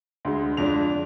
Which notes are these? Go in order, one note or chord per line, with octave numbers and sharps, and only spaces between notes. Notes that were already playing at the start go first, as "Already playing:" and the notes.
D2 D3 G#3
F2 D3 G#3 D4 F7